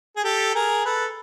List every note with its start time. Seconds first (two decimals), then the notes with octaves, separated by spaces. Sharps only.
0.16 G#4
0.24 G4 A4
0.55 G#4 A#4
0.85 A4 B4